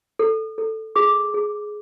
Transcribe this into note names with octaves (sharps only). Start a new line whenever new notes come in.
A4
A4
G#4 D6
G#4